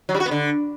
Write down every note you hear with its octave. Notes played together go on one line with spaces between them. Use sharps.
F#3
G3
F#4
B3
D3